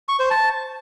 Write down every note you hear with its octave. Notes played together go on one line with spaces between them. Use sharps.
C#6
C5
A5